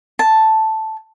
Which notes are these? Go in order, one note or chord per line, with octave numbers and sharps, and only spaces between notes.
A5